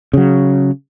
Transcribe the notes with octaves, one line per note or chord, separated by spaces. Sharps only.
C#3 F#3